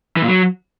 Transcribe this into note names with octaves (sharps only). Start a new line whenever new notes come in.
E3
A#2
F#3